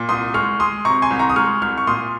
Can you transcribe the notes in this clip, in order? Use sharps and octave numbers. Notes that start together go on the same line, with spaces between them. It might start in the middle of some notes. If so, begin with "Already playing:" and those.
Already playing: A#2
C2 C6 D#6
G#3 C#6 F6
G#3 C6 D#6
C3 A#5 C#6
G#5 C6
C2
A#5 C#6
D#6
G#3 C#6 F6
C2 C#6 F6
C#6
A#2 C6 D#6